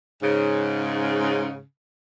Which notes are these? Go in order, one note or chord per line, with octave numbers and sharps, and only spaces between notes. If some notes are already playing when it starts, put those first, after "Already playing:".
G#2 C#3